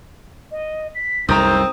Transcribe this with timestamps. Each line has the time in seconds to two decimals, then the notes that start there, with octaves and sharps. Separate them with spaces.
0.51 D#5
0.95 B6
1.29 C2 F#2 D#3 A3 C4 A#5 D#6 G6